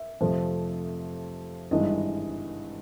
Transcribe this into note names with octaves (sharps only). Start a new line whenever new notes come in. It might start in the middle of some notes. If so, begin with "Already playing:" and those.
Already playing: E5
F2 C3 F3 A3
G#1 G2 E3 G#3 D#5